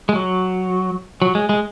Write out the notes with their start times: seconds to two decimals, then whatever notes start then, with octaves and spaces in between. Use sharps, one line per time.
0.09 G#3
0.15 F#3
1.22 F#3
1.35 G#3
1.49 G#3